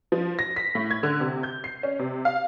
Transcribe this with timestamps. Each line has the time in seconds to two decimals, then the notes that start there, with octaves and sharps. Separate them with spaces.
0.12 F3
0.39 A#6
0.56 B6
0.75 A2
0.90 G#6
1.03 D3
1.20 C3
1.43 G6
1.64 C7
1.83 C#4
1.99 C3
2.25 F5